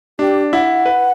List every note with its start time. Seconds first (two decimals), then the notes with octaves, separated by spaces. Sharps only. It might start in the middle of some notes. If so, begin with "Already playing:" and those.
0.19 D4 G4
0.53 E4 F#5
0.86 B4